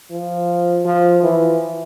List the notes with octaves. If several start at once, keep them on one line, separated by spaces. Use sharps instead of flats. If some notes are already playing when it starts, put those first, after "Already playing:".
F3
F3
E3